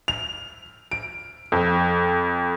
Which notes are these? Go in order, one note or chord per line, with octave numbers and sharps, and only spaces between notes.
F7
D7
F2